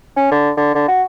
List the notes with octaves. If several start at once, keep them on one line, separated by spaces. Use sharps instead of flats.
C#4
D3
D3
D3
F#4